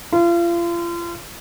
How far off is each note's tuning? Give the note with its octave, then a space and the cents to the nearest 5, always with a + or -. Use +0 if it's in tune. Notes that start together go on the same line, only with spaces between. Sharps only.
F4 -35